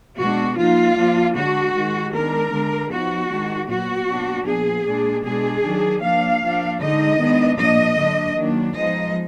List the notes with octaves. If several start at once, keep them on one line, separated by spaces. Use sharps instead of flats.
B2 G#3 D4 F#4
F3 A#3 D#4 F4
F3 A#3 D4
D3 G#3 D4 F#4
D#3 G#3 D#4
D#3 G#3 B3 D4 A#4
D3 G#3 D4
F3 B3 D#4 F#4
D#3 G#3 D4
A#2 F#3 B3 F#4
B2 F#3 A#3 D4
A#2 F3 B3 G#4
A#2 G#3 D4
B2 G#3 D4 G#4
D#3 F#3 D4
F3 A#3 D4 F5
F3 A#3 D4
D3 G#3 D#4 D#5
D#3 G#3 B3 D4
A#2 F3 A#3 D4 D#5
D3 F#3 D4
D#3 F#3 A#3 D4
F3 G#3 B3 D#4 D#5